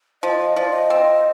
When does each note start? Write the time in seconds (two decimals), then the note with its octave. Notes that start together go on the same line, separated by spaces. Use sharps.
0.23 F3 D#5
0.39 D#5
0.56 F3 D5
0.73 D#5
0.90 C4